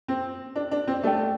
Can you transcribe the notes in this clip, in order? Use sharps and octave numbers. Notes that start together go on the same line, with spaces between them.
C4
D4
D4
C4
A3 D4 A4 D5 G5